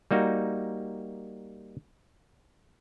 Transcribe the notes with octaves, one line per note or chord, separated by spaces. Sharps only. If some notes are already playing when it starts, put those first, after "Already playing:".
G3 A#3 D#4 F#4